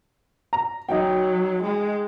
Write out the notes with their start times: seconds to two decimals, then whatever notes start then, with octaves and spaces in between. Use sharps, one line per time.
0.53 A#5
0.89 F#3 D#4 G5
1.63 G#3